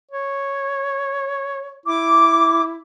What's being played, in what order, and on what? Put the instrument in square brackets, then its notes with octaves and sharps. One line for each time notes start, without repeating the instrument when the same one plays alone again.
[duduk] C#5
[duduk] E4 [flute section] D6